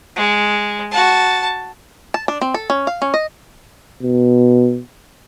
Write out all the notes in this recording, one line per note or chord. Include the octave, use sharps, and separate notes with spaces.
G#3
F#4 A5
A5
D4
C4
A4
C#4
F5
C#4
D#5
B2